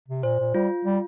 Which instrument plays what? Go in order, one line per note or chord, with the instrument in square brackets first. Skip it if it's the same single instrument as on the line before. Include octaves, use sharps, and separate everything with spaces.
[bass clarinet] C3
[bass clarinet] A#2 [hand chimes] C5
[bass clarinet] A#2
[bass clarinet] G3 [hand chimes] F4
[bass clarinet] G3